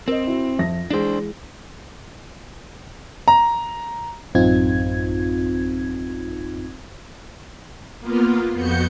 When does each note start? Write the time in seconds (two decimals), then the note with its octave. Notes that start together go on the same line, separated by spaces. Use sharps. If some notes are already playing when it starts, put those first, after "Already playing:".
0.08 C4 A#4 D#5
0.27 E4 F#4
0.59 F2 E5 A#6
0.90 E3 G#3 D4 G#4 C5
3.28 A#5
4.35 A1 F#2 C4 D#4 F4 G#6
7.99 A#3 B3 F4
8.53 F2 B3 F#4 G6 C#7